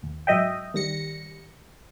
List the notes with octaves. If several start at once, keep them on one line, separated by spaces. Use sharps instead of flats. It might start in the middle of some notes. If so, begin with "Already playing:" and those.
D#2
G#2 F#3 D#5 E5 G5
D#3 G3 A#6 C#7